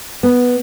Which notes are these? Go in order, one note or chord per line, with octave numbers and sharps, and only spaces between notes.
B3